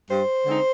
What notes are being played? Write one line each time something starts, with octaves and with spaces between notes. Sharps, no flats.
G2 C5
D3 G#3 C4 D#4